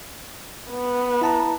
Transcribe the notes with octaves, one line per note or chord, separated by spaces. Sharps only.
B3
E4 A5 A#5